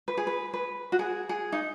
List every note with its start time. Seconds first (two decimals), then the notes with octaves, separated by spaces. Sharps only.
0.08 B4
0.17 G#4
0.27 B4
0.54 B4
0.92 F#4
0.99 G#4
1.29 G#4
1.52 D#4